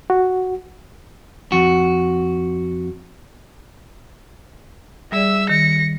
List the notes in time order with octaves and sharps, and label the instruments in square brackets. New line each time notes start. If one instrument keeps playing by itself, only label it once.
[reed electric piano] F#4
[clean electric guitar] F2 F#4
[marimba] G3 G#4 D5 [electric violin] E5 E6
[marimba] D#3 [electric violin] A#6 C#7